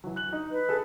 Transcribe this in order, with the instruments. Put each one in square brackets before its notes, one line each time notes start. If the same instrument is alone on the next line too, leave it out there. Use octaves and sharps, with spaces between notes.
[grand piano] E3 F#3
F#6 F#7
D#4
[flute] B4
[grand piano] G#4 A4